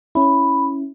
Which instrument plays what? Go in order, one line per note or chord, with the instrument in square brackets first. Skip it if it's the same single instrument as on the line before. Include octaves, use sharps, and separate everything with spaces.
[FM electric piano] C#4 E4 [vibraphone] B5